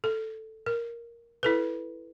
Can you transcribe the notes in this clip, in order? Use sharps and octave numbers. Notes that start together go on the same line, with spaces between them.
A4
A#4
E4 A4 B4